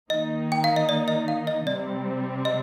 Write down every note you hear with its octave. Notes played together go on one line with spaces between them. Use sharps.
D#3 A#3 D#4 D#5
G5
F5
D#5
D5
D#5
F5
D#5
C3 G3 C4 D5
D#5